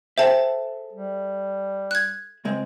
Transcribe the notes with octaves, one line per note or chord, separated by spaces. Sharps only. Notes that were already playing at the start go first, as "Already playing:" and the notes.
G#4 A4 C5 E5 G5 A5
G3
F#6 G#6
C#2 G#3 C4